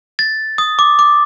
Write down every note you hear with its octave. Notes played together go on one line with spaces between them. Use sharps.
A6
D#6
D6
D6